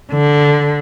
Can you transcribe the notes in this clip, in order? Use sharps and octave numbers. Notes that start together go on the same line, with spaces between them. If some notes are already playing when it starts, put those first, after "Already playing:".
D3